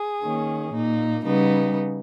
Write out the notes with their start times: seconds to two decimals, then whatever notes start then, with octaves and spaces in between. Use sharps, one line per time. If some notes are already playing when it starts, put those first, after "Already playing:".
Already playing: G#4
0.23 D#3 A#3 C#4
0.74 A#2 A#3 D#4
1.25 C#3 G3 B3 D#4